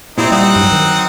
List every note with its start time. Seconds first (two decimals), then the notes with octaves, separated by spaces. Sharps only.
0.18 A#2 C4 D#4 E4 G4
0.32 G3 C4 D#4 F#5
0.56 G2 F#3
0.72 D#3